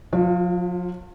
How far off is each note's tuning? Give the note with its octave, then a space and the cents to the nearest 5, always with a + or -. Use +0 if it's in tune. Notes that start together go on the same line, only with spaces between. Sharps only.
F3 +45 F4 +0